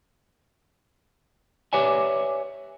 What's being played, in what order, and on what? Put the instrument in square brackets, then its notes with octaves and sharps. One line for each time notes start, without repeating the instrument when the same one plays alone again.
[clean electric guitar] G4 B4 C#5 D5 E5 G#5